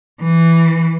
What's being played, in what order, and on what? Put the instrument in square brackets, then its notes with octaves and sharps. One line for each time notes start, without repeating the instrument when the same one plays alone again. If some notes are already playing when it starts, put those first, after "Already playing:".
[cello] E3